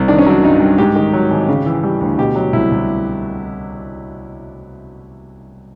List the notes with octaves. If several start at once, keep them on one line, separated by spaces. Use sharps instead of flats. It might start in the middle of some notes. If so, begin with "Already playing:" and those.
Already playing: C2
D#3 D4
C#4
F#3 D4
G2 D#4
G2
G#2 G4
D#3
F#3
G#1
C#3
E3
G3
D2
B2 G4
F#3
C2 E4
C2